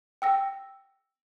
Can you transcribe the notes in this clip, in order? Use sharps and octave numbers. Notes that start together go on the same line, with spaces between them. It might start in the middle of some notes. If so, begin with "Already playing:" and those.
G5 E6 A#6